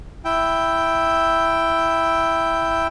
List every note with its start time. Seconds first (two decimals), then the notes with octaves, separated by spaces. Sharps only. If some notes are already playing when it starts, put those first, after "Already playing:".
0.25 E4 G5